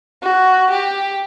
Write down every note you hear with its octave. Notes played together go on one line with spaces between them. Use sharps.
F#4
G4